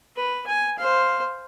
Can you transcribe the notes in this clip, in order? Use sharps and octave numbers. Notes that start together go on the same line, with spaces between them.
B4
G#5
C5 F5